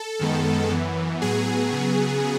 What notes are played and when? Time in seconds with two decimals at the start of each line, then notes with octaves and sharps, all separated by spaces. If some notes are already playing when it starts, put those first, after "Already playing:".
Already playing: A4
0.19 F#2 D#3 G#3 B3
0.71 F#2 E3 B3
1.22 A2 F#3 B3 G#4
1.72 C#3 F#3 B3